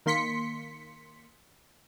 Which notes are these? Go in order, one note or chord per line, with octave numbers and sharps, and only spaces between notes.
D#3 A#3 C6 B6 C#7